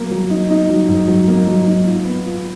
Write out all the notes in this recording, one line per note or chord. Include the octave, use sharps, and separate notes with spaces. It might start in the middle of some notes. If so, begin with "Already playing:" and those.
Already playing: F#3 A#3
F#3
D#4
D#4
F#3
G#2
F#3
A#3
F#3
D#4
F4
B3
F4